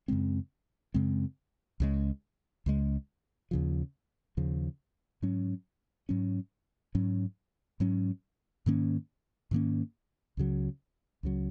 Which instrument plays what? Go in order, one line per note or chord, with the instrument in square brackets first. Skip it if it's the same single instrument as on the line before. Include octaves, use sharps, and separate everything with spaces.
[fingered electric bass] F#2 C#3 G#3 C4
F#2 C#3 G#3 C4
C#2 C#3 G#3
C#2 C#3 G#3
D#2 C#3 F3
D#2 C#3 F3
G#2 F#3 C#4
G#2 F#3 C#4
G#2 F#3 C#4
G#2 F#3 C#4
G#2 D#3 A#3 C#4
G#2 D#3 A#3 C#4
C#2 C#3 F#3
C#2 C#3 F#3